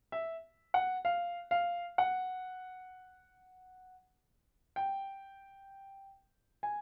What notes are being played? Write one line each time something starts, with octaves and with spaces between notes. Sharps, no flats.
E5
F#5
F5
F5
F#5
G5
G#5